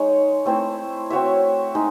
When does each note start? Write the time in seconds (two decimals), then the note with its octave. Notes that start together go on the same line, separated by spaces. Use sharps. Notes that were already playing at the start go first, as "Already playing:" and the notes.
Already playing: G#3 D#4 G#4 C#5
0.45 A3 C4 E4 C5
1.10 C4 F#4 C#5 E5
1.75 G#3 D#4